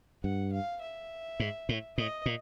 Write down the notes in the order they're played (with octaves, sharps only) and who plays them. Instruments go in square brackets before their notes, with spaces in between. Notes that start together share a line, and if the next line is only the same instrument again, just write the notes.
[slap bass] G2 [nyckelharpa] F#5
[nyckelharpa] F5
E5
[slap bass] G#2
A2
[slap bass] A2 [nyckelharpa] D#5
[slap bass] A#2